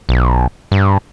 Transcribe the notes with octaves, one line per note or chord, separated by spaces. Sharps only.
B1
G2